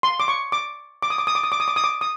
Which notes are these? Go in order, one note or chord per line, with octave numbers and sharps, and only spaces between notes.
C6
D6
C#6
D6
D6
D#6
D6
D#6
D6
D#6
D6
D#6
D6
D#6
D6
D#6